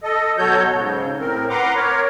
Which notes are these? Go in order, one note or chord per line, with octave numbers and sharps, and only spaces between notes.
A4 D#5
B2 F#3 F#4 A4 C#5 G6
G#2 C#3
A2 C4 A#4
B4 F#5 A#5 C6 D6
A#4 C#5